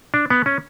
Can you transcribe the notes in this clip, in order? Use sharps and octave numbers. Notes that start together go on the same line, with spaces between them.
D4
B3
C#4